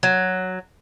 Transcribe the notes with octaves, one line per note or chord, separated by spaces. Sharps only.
F#3